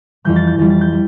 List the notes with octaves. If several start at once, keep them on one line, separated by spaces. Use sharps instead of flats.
F2 E3 G3 G6
A6
G6
F2 E3 G3 A6
A6
G6
G3